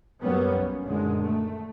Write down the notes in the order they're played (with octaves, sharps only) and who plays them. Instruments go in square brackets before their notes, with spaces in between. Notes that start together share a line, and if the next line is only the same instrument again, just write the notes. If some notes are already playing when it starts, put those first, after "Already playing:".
[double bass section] F#2 F#3 G3 A#3 B3 C#4
B1
A#1 F#2 D3 D#3 G#3
A3